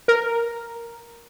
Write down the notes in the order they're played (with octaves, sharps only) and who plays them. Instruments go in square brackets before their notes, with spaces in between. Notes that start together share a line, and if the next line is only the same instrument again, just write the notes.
[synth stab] A#4